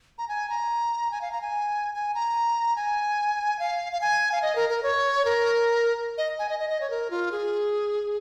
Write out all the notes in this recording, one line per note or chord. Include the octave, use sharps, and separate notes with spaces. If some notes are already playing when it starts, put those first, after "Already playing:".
A#5
G#5
A#5
G#5
F5
A#5
G#5
G#5
A#5
G#5
F5
F5
G#5
F5
D#5
A#4
A#4
C#5
A#4
D#5
G#5
D#5
D#5
D#5
C#5
A#4
F4
G#4